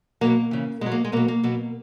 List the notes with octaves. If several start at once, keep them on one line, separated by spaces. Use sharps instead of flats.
B2 F#3 A#3
C#3 E3
B2 F#3 G#3
A#3
G#3
B2 F#3 A#3
A#3
B2 F#3